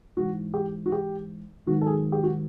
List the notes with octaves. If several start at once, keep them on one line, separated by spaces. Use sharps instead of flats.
G#2 E3 F#4
G4
F#4
G4
G#2 D#3 F#3 F#4
A4
G#4
G4
F#4